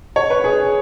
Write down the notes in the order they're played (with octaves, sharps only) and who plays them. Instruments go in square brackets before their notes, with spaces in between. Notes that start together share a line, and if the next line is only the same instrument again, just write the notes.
[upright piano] C#5
B4
G#4